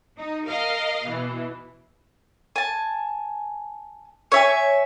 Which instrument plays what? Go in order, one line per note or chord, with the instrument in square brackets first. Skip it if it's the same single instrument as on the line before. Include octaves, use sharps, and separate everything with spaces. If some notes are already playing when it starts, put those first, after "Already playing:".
[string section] D#4
A#4 D#5 F5
B2 E3
[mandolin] G#5 A5
C#5 E5 G#5